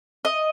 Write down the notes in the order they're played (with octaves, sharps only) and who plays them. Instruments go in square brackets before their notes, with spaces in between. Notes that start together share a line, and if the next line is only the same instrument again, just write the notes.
[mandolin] D#5